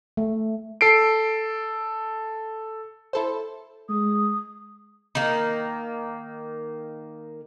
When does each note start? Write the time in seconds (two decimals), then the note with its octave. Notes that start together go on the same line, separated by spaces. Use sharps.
0.17 A3
0.81 A4 C7 D7
3.13 E4 A4 C5
3.89 G#3 D#6
5.15 D#3 A#3